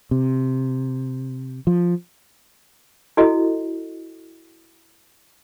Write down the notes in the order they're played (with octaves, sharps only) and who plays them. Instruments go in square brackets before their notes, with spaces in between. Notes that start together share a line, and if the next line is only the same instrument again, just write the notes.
[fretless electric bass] C3
F3
[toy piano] E4 F#4 A4 D#5